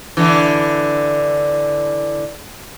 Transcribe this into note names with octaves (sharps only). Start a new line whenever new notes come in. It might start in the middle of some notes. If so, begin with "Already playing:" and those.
D3 E3